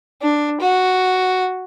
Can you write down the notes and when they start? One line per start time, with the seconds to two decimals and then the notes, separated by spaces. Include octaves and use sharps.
0.22 D4
0.61 F#4